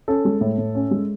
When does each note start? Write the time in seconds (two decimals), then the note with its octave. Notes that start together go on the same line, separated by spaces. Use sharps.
0.08 C#4 A4
0.25 G#3
0.41 A2
0.58 A2
0.75 C#4
0.91 G#3